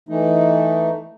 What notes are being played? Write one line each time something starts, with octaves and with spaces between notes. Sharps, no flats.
E3 A3 D#4